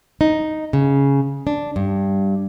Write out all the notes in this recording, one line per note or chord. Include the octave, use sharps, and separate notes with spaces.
D#4
C#3
D4
G2